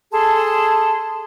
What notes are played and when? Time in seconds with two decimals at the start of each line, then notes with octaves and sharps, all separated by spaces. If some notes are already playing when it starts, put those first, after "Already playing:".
0.12 G#4 A4 A5 C6